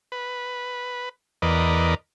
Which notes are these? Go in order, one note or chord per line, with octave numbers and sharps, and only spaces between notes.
B4
E2 A#4 B4 D5 D#5